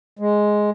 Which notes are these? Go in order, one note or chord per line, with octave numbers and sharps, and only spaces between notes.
G#3